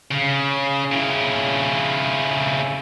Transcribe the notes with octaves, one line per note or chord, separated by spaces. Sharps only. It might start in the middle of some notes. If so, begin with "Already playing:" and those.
C#3
C#3 E4